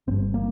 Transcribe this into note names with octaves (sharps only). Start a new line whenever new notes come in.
G1 G2 C4
A#3